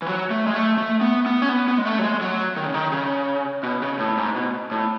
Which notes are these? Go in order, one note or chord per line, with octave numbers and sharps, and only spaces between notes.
E3
F#3
A3
G#3
A3
A3
B3
B3
C#4
B3
B3
G#3
A3
F#3
G#3
F#3
D#3
C#3
D#3
C#3
B2
C#3
A2
G#2
B2
A2